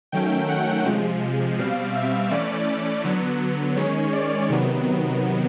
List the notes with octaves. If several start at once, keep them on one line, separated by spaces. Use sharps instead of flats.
D#3 F#3 A3 C#4 G5
F#5
C3 F3 G#3
B2 G3 C4 F5
E5
E3 A3 C#4 D5
D3 F#3 B3
D#3 G#3 C#4 C#5
D5
C3 D#3 F#3 B3